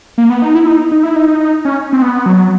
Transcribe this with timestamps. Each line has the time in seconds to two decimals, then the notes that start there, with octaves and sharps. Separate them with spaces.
0.18 A#3
0.30 B3
0.42 D#4
0.55 E4
0.67 D#4
0.92 D#4
1.03 E4
1.16 D#4
1.28 D#4
1.40 D#4
1.65 C#4
1.93 C4
2.02 B3
2.26 F#3